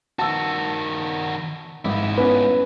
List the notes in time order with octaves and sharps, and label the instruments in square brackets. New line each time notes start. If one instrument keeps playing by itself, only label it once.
[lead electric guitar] D#3 F#4 [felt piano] A5 E6
[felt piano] G#1 [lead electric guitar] G#2 E4
[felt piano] B3 C#4 [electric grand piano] B4